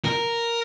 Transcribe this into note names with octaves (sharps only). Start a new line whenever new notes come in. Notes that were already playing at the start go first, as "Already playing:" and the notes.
A#4